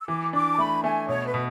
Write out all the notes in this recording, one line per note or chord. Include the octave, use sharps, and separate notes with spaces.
E6
E3 D6
D4 D6
A5
A3 B5
A3 G#5
B2 C#5
B4
B2